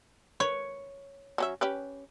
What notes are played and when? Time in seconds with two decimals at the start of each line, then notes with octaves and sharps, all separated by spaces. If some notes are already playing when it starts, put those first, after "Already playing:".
0.40 B4 C#5
1.38 F#3 C#4 E5
1.61 C#4 G4 B4